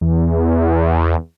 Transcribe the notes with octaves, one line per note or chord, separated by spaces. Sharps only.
E2